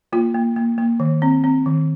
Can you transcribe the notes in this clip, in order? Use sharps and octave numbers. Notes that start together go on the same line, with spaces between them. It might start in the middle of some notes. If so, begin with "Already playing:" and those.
A#3 F4
A#3
A#3
A#3
D#3
C4
C4
D#3